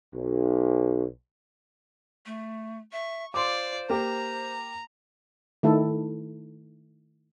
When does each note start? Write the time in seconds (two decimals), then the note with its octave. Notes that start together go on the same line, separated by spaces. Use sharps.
0.15 B1
2.26 A3
2.92 E5 C#6
3.34 F4 C5 D5 C6 D6
3.89 A#3 G4 A#5
5.63 D#3 A3 E4 A4